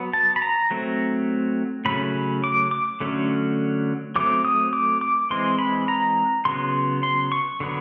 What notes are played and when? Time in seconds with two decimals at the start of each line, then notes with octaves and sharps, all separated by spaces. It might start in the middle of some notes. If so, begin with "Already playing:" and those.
Already playing: F#3 B3
0.13 A5
0.36 B5
0.42 A#5
0.71 F#3 A3 C4
1.85 C#3 F#3 A3 C#4 B5
2.44 D6
2.71 D6
3.00 D3 F#3 A3 C#4
4.16 F#3 A3 C4 D6
4.45 D#6
4.73 D6
5.01 D6
5.31 E3 G#3 C4 C6
5.59 B5
5.88 A#5
6.45 C#3 F#3 B3 C6
7.03 C6
7.32 C#6
7.60 D3 F#3 B3